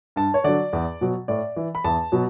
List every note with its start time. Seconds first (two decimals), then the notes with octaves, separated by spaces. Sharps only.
0.16 G2 A5
0.34 C#5
0.44 D3 F#3 D5
0.73 E2
1.01 B2 F#3
1.28 A2 D5
1.56 E3
1.75 B5
1.84 E2 A5
2.12 B2 F#3